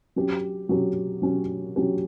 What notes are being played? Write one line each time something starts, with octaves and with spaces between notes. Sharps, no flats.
F#3 C#4 G4
F#3 C#4 G4
F#3 C#4 G4
F#3 C#4 G4